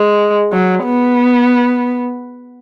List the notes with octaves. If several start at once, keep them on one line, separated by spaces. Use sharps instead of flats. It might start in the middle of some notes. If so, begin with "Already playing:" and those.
Already playing: G#3
F#3
B3